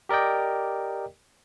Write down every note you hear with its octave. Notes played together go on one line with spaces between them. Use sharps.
G4 A#4 D5 D#5 G5